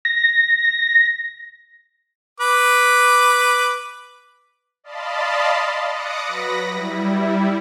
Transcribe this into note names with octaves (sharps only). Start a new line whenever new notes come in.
A#6
B4 D6
D5 D#5 F5 A5 B5 C6
D6 D#6 F#6 A#6 C#7
F#3 B4 B5 A#6
G3 E4